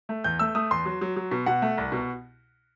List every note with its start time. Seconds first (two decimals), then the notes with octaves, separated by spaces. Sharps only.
0.09 A3
0.24 E2 G6
0.39 A3 E6
0.55 A3 D#6
0.71 E2 C6
0.86 F#3
1.01 F#3
1.16 F#3
1.31 B2
1.46 B2 F#5
1.62 A3
1.78 C2
1.92 B2